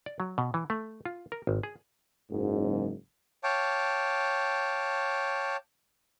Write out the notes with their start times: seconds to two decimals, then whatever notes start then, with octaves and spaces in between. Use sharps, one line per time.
0.06 D5
0.20 F#3
0.38 B2
0.54 E3
0.70 A3
1.05 F4
1.32 A#4
1.47 G#1
1.63 G#4
2.30 F#1 G#2
3.44 C#5 F5 G5 A5 D6